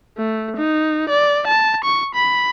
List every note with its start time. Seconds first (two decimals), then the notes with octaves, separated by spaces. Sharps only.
0.17 A3
0.57 D#4
1.10 D5
1.48 A5
1.85 C#6
2.15 B5